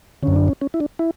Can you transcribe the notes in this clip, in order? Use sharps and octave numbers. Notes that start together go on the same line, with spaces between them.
F#2 D3 C#4
D4
C#4
C#4
E4
D4
E4